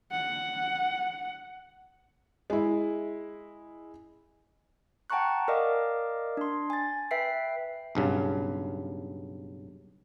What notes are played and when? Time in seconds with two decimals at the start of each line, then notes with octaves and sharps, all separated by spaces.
0.11 F#5
2.50 G#3 E4
5.10 F#5 G5 A5 A#5 C#6 F#6
5.48 A#4 D5 D#5 F5 D6
6.37 D4 C6
6.70 G#5 A6
7.11 B4 E5 G5 B6 C7
7.95 B1 G2 C#3